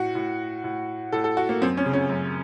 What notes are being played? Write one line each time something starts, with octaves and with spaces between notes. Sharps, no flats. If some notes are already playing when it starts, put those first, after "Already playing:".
Already playing: A2 F#4
A2
A2
A2 A4
A4
F#4
A#3
F#2 C4
C#4
C#3
C#4
F#2